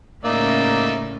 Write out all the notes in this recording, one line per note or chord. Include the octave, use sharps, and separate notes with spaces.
A2 C#3 A#3 D#4 D5 E5